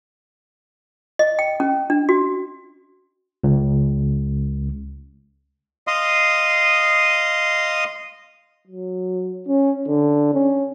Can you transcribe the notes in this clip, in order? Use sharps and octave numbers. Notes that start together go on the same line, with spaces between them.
D#5
G5
C#4
D4
F#4
C#2
D#5 F5 C6 D#6
F#3
C#4
D3
C#4